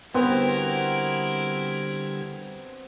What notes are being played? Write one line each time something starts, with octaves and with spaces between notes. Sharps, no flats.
D3 G3 B3 C4 E4 F#4 A#4 G#6